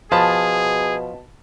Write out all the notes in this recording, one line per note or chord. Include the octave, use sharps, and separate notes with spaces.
B2 F3 G#4 A5 B5